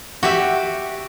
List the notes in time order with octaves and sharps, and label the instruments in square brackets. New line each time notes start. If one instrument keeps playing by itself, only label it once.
[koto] F#4 G4 E5